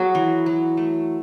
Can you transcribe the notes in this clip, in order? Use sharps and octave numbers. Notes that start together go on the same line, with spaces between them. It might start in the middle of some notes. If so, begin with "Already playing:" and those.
Already playing: F#3 B3 F#4 G#4
E3
F#3
A3